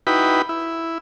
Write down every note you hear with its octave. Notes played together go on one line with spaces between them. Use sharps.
D#4 E4 F#4 B4 G5 B5
E4